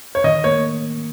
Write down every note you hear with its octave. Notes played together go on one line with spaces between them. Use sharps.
C#5
D#3 D#5
A#3 C#5